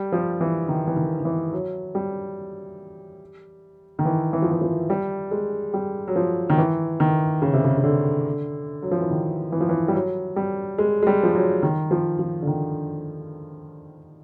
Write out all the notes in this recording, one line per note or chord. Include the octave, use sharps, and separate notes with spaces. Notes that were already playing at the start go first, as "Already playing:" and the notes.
Already playing: G3
F3
E3
D#3
E3
D#3
D#3
E3
F#3
G3
D#3
E3
E3
F3
E3
F3
G3
G#3
G3
F#3
F3
D#3
E3
D#3
C#3
C3
C#3
C#3
D3
F#3
F3
E3
D#3
E3
F3
E3
G3
F#3
G3
G#3
G#3
G3
F3
F#3
D#3
F3
F3
D3
D#3